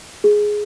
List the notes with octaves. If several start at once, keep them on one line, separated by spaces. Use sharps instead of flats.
G#4